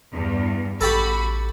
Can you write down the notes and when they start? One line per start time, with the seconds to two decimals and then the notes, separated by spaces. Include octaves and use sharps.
0.13 E2 G2
0.81 A1 F#4 G4 A4 B5